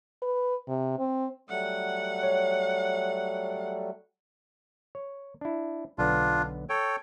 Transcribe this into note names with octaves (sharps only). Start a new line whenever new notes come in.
B4
C3
C4
F#3 G3 A3 F#5
C#5
C#5
D4 E4
B1 D3 B3 D4 F4
A4 C#5 G5